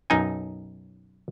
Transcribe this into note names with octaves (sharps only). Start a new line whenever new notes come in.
B1 F#2 D#4 G#5